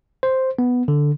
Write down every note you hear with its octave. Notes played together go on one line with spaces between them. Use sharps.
C5
B3
D3